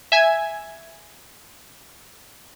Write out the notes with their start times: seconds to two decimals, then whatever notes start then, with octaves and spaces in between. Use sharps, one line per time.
0.12 E5 G#5 G#6